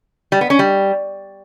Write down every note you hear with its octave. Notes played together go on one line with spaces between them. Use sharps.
G3
B3
C#4
G3